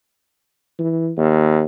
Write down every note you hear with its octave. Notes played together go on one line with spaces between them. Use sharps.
E3
D#2